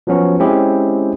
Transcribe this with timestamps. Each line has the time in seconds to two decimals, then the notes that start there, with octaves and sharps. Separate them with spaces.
0.07 F3 F#3 B3 C#4 F#4
0.40 G#3 C4 C#4 E4 G4 G#4